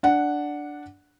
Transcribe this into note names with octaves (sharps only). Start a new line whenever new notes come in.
D4 F#5